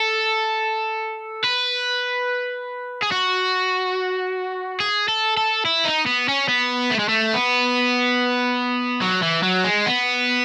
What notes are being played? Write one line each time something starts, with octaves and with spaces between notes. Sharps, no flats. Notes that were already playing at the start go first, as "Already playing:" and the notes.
Already playing: A4
B4
G#4
F#4
G#4
A4
A4
E4
D#4
B3
C#4
B3
A3
G#3
A3
B3
F#3
E3
F#3
G#3
B3